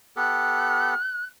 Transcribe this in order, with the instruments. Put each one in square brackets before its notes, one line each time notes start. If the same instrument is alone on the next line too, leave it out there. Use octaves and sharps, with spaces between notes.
[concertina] B3 G4 A4 [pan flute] F#6